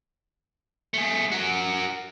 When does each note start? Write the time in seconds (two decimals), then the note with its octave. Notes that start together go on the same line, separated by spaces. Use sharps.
0.94 A3 G#4
1.32 F#4 A#4